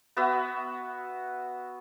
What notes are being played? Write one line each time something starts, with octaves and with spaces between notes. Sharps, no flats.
B3 F#4 E5